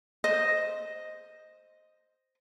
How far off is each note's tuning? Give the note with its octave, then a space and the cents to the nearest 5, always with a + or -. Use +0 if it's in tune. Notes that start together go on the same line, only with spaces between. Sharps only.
C5 +0 D#5 +0